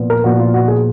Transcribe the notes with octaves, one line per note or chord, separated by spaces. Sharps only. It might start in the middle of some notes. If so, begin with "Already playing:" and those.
Already playing: A#2 F3 B3
A#4
A#2 F3 B3 F#4
F4
F#4
G#4